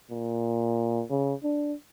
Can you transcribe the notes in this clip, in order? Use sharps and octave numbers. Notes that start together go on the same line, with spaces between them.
A#2
C#3
D4